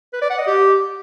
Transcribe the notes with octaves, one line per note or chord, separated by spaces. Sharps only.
B4
D5
F#5
D#5
G4